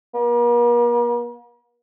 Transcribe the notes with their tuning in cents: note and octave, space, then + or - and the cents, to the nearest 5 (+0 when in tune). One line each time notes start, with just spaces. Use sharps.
A#3 +45